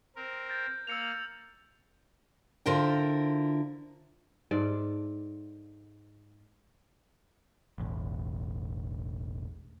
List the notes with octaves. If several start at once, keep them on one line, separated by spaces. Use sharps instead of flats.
C4 A#4
G6 A6
A#3 E6 F6 C#7 F7
D3 E4 F4 A#4 C5 G5
G#2 A4 D5
E1 A1